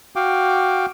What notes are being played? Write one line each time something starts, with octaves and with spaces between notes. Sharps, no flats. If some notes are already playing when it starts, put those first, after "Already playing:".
F#4 F5 G5 D6